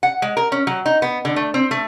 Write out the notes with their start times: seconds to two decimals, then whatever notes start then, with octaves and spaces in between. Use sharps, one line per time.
0.03 F#5
0.22 G#3
0.37 A#4
0.52 C#4
0.67 F#3
0.86 D#4
1.02 B3
1.25 D3
1.36 A3
1.54 C4
1.71 A3